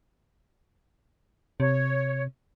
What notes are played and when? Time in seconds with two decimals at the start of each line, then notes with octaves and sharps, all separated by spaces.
1.60 C3 C#5